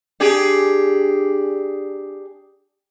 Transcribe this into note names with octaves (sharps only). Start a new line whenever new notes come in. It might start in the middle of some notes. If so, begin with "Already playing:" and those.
D4 G4 G#4